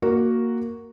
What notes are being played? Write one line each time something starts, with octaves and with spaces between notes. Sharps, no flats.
A#3 F#4 A#4